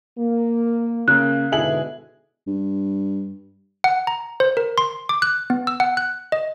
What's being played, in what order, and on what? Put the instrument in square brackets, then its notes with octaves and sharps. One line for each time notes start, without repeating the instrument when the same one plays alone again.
[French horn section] A#3
[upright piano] C#3 A#3 [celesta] F#6
[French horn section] G#2 B2 D3 [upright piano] E4 G#4 F#7
[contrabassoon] G2
[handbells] F#5
A#5
C5
A#4
C6
D6
F#6
B3
E6
F#5
F#6
D#5